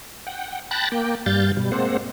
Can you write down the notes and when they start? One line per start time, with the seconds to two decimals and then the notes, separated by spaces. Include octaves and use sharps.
0.27 F#5 G5
0.71 G5 A5 B5 F#6 A6 A#6
0.92 A#3 G5
1.26 G2 G3 F5 G6 A6
1.57 B2 G3
1.72 G#3 A#3 C4 C5 F#5